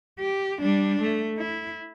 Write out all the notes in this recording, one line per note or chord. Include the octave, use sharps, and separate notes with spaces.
G4
G3 D4
A3
E4